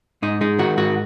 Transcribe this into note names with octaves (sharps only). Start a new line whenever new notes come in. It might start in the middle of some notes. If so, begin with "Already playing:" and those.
G#2 D#4
G#3 D#4
D#3 F#4
G#2 F#4